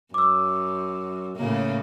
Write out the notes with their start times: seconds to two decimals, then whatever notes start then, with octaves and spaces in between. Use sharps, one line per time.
0.14 F#2 D6 E6
1.37 A2 C#3 A#3